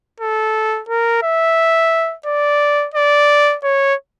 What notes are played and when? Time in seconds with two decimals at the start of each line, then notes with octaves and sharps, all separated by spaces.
0.20 A4
0.89 A#4
1.23 E5
2.26 D5
2.94 D5
3.64 C#5